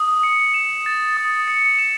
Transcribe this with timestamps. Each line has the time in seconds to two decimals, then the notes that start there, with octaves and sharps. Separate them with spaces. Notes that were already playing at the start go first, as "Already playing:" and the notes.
Already playing: D#6
0.23 C#7
0.54 E7
0.86 A6
1.17 D#6
1.48 C#7
1.78 E7